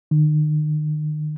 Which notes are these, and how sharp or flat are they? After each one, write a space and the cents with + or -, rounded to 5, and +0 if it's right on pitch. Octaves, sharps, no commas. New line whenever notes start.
D#3 -40